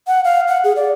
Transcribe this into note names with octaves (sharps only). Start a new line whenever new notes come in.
F#5
F5
F#5
G#4
D5